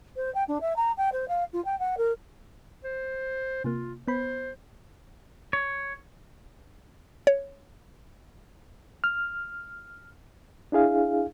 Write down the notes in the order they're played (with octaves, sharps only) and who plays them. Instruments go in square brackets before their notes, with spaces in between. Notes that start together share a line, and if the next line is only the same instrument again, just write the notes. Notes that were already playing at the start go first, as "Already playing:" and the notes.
[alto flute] C5
G5
D4
E5
A#5
G5
C5
F5
F4
G5
F#5
A#4
[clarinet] C5
[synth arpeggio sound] C3 A#3 [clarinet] F4
[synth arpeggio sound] B3 B5 [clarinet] C5
[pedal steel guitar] C#5
[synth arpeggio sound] C#5
[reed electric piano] F6
D4 E4 G#4 F5